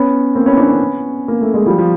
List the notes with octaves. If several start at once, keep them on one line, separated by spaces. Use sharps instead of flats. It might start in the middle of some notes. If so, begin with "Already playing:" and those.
Already playing: B3 C#4
A#3 C4
B3 C#4
C4 D4
B3 C#4
A#3
A3
G#3
F3 G3
F3